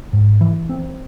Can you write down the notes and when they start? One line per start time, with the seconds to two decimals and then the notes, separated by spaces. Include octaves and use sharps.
0.13 G#2
0.41 E3
0.69 C4